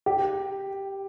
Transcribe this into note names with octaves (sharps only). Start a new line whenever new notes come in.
G4